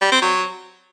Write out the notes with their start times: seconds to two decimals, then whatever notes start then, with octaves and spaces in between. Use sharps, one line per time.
0.01 G3
0.12 C4
0.22 F#3